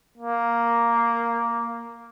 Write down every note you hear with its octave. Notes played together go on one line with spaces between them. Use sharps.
A#3